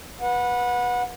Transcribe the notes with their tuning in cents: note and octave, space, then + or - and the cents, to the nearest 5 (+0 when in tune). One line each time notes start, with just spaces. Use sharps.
B4 -15 F#5 -25